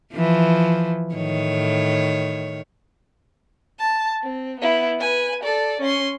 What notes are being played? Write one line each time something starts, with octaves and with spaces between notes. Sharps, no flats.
E3 F3
A2 D#3 C#5
A5
C4
B3 E4
B4 G#5
A4 D5
C#4 C6